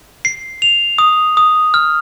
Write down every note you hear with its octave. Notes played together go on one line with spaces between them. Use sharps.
C7
F7
D#6
D#6
F6